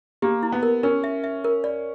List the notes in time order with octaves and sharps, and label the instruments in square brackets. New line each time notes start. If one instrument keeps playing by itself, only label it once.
[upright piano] A#3 [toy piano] G4
[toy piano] E4
[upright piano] B3
[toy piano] A#4
[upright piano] C#4 [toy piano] A#4
[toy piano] E5
E5
A#4
D5